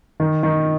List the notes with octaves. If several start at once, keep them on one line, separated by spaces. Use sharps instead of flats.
D#3
D#3